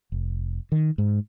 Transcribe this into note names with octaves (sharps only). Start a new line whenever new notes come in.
F1
D#3
G#2